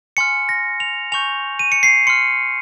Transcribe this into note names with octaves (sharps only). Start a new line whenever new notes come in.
G#5 C6 F6 C#7
A#6
F7
G#5 C#6 G6 F7
D#7
C#7
C7
C6 F6 C#7